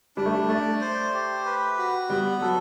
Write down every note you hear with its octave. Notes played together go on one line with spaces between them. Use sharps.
G3 D4
A3
G3
A3 D5
C5
G4
B4
F#4
G3 B3
F#3 A4